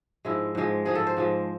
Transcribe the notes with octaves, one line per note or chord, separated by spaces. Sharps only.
G#2 F3 G#3 E4
G#2 F3 G#3
G#2 F3 G#3 G#4
A4
C5
G#2 F3 G#3